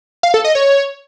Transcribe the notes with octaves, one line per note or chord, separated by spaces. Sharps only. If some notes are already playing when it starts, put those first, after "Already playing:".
F5
A4
D#5
C#5